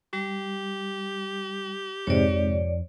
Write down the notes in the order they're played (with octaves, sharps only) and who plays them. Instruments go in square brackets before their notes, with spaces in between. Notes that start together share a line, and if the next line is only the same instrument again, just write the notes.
[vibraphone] G3 [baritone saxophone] G4
[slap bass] F2 F3 [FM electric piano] G#2 C3 [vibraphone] C#5 D5